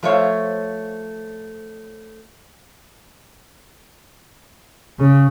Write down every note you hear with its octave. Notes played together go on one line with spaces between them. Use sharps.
F3 A3 C5 C#5 F5
C#3